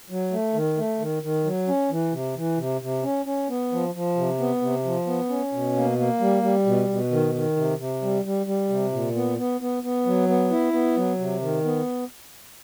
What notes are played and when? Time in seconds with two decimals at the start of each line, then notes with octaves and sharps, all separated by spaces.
0.10 F#3
0.32 A3
0.54 D#3
0.77 A3
0.99 D#3
1.23 D#3
1.45 F#3
1.68 C#4
1.91 E3
2.12 C3
2.36 E3
2.58 C3
2.81 C3
3.03 C#4
3.26 C#4
3.49 B3
3.72 F3
3.95 F3
4.16 C3
4.40 B3
4.62 C3
4.85 F3
5.07 B3
5.29 C#4
5.52 B2
5.76 A#3
5.98 A#3
6.20 G3
6.43 G3
6.66 B2
6.89 B2
7.11 D#3
7.34 D#3
7.56 C3
7.78 C3
8.02 G3
8.25 G3
8.46 G3
8.69 C3
8.92 A#2
9.15 B3
9.38 B3
9.61 B3
9.83 B3
10.06 F#3
10.29 B3
10.51 E4
10.73 B3
10.97 F#3
11.19 C3
11.41 D#3
11.64 B3